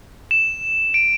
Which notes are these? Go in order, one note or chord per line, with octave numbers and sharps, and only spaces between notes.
E7
D7